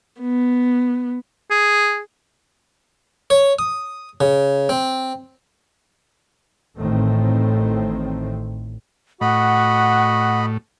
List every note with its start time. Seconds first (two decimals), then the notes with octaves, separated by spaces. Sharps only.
0.21 B3
1.51 G#4
3.30 C#5
3.59 D#6
4.21 C#3
4.69 C4
6.76 A1 A2 D#3 A3 C4
9.21 A2 F#4 D#5 F#5 B5